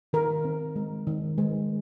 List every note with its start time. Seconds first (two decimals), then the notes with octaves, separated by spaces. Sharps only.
0.13 D#3 A#4
0.45 C4
0.76 G#3
1.07 D#3
1.38 G#3